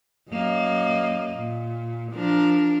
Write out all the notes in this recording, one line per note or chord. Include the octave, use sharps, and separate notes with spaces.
F#2 A#3 D#5
A#2
F3 D4 A#4